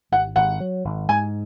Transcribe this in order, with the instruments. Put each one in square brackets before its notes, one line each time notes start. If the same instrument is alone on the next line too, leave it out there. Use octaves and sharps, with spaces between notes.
[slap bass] G#1 [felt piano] F#5
[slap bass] G#1 [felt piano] F#5
[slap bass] F#3
G#1
[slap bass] G#2 [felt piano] G#5